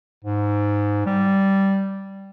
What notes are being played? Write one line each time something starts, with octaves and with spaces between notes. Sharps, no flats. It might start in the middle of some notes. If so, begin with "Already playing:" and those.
G#2
G3